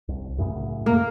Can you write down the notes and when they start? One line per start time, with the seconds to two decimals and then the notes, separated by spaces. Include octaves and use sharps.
0.08 C2
0.38 F#2 A2 C#3
0.86 A#3